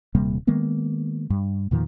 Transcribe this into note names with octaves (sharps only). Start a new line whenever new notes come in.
D#1 C3 G3 A#3
D#3 G#3 A#3 B3
G2
E2 A#2 D#3 F3